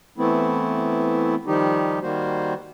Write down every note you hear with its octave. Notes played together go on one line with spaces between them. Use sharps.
E3 A3 B3 C4 E4
D#3 F3 G3 D#4 G4
D#3 G3 A#3 F#4 C5